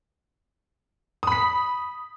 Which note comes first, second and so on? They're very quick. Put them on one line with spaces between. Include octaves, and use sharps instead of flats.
D#6 B5 B6